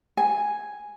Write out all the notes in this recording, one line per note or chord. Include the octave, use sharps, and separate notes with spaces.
G#5